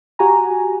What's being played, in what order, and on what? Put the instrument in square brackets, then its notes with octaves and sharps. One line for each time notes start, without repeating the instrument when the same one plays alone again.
[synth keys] F#4 G4 G#5 A#5